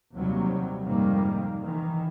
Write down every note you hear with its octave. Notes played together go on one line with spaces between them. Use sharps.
D#2 C3 F#3 G3
F2 G#2 C3 D#3 G3 A#3
D#3 E3